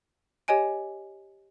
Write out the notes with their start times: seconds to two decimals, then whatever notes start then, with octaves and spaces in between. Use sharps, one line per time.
0.48 G4 C#5 D#5 G#5 D7